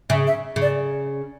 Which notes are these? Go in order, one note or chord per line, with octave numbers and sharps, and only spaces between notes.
C#3 E5
E5
C#3
D5